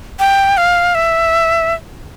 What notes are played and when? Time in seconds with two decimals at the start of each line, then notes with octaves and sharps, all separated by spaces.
0.20 G5
0.57 F5
0.95 E5